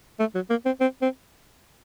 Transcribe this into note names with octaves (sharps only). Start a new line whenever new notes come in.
A3
F#3
A#3
C4
C4
C4